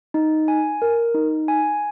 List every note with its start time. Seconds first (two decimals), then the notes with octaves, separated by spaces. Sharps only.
0.14 D#4
0.48 G#5
0.82 A#4
1.14 D#4
1.48 G#5